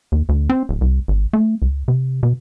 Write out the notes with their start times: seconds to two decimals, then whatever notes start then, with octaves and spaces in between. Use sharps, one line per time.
0.12 D#2
0.29 D2
0.50 C4
0.69 D1
0.81 C2
1.08 G#1
1.33 A3
1.62 C#2
1.88 C3
2.23 B2